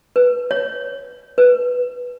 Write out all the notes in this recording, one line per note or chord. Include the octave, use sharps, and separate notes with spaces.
B4
C#5
B4